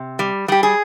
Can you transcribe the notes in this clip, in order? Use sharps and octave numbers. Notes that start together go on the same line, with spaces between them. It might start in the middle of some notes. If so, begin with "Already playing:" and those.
Already playing: C3
G3
G3 G4
G#4